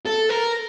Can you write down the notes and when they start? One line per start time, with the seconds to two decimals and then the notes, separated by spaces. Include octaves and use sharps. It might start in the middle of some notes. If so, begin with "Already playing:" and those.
0.05 A4
0.29 A#4